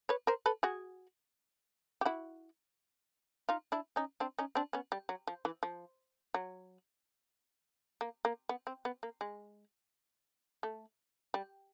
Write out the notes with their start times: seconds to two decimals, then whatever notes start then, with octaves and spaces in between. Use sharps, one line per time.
0.09 B4 C#5
0.27 A#4 C5
0.46 A4 B4
0.63 F#4 G#4
2.01 G4
2.05 E4 F#4
3.49 D#4 F4
3.72 D4 E4
3.96 C#4 D#4
4.20 C4 D4
4.39 C#4 D#4
4.55 C4 D4
4.73 B3 C#4
4.92 G3
5.09 F#3
5.27 F3
5.45 E3
5.63 F3
6.34 F#3
8.01 A#3
8.25 A#3
8.49 B3
8.67 C4
8.85 B3
9.03 A#3
9.21 G#3
10.63 A3
11.34 G3